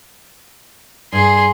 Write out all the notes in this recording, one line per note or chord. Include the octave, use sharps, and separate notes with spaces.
G2 G#4 C6